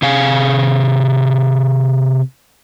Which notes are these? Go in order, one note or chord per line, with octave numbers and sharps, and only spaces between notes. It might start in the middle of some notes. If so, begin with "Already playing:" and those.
C3 G#4 F5 G#5